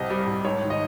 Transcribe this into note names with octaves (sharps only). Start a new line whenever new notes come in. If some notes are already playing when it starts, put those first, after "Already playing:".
Already playing: C2 C3 D#5
G3
C2
G#2 C#5
D#3
D#5